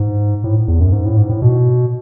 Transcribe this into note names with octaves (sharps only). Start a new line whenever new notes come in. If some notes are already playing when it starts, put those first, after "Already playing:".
Already playing: G#2
A2
E2
F#2
G#2
A2
G#2
A2
B2